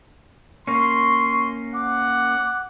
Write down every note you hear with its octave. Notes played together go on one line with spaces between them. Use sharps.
A#3 C#4 C6 C#6
F#5 D6